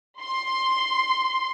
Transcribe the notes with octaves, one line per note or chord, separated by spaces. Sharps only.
C6